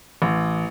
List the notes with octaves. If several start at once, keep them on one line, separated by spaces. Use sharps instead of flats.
A1